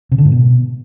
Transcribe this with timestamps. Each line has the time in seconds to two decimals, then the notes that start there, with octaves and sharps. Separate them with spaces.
0.12 C3
0.18 D3
0.25 G#2
0.32 B2